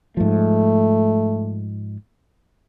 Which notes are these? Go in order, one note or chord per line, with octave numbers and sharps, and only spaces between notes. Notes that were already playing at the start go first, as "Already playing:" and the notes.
G#2 F3 A3